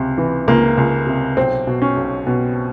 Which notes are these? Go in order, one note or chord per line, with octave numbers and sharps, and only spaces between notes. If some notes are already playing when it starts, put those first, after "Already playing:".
Already playing: C#2 C3
E3
C#2 A#3
C#2
C3
B1 C4
B2
C#4
B1
B2